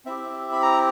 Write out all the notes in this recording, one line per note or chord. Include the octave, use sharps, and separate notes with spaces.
C4 E4 G4 E5
B5
A#5